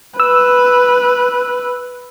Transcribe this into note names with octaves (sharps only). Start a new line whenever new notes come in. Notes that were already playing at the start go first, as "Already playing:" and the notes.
B4 E6